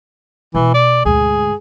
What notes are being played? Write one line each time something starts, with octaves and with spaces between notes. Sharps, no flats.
B2 E3
D5
D2 G#2 G#4